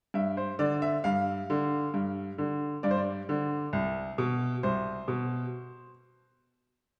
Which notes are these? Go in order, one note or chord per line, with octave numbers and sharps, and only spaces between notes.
G2 E5
C5
D3 D5
E5
G2 F5
D3
G2
D3
G2 D5
C5
D5
D3
C2
B2
C2 C5
B2